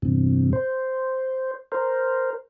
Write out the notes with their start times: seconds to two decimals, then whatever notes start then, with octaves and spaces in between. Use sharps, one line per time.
0.02 E2 G2 C3
0.53 C5
1.72 A#4 C5